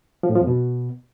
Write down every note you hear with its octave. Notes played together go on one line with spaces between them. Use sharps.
F3
A2
F3
F2
B2